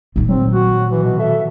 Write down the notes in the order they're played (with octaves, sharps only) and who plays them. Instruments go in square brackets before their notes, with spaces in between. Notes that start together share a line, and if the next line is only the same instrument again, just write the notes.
[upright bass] A#2 D#3
[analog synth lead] F#3 [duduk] C4
[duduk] F#4
E3
B2
[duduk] A4 [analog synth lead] E5